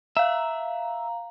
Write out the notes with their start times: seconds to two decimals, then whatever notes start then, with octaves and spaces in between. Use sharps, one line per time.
0.17 E5 F5 A#5